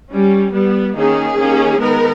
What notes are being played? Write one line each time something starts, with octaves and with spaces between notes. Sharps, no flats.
G3 C#4
G3 B3
D#3 A#3 C#4 G#4
D#3 A#3 C#4
D#3 G#3 B3 A#4